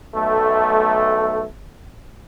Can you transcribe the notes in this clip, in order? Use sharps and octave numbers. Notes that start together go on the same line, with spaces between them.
B1 A3